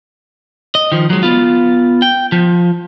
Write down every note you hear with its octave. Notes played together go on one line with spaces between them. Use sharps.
D#5
D#3 F3
F#3 G#3
B3 F4
G5
F3